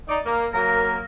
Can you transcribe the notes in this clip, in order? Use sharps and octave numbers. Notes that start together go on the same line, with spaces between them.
D#4 D5
A#3
F#3 A#3 A#4